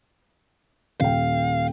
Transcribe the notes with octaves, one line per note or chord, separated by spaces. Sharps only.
D#1 F5 G5